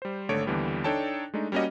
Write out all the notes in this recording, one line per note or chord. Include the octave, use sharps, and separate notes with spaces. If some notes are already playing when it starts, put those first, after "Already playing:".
G3 C5
G#1 D3 A3 C#5 D7
D#2 D3 E3 G3 B3
D4 D#4 A4 C#5 G5 A5
G#3 A3 D4 D#4
G3 A#3 C#4 F#4 D#5